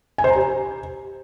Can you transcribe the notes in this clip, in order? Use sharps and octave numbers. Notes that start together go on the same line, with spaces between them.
G#5
C5
A#5
G4